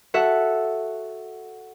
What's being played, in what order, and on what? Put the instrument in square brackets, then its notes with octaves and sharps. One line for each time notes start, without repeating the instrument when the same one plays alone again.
[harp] F#4 A4 E5 F#5